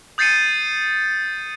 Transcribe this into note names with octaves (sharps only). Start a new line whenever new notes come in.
D#6 G6 A6 C7 C#7 D#7